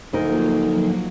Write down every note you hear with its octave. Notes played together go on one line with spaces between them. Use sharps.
D2 F3 F#3 A#3 D#4 A#4